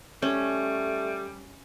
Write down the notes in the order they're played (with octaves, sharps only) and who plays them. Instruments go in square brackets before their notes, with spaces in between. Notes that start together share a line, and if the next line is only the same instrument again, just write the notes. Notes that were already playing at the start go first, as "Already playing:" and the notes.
[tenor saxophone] G3 [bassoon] A3 [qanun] C#4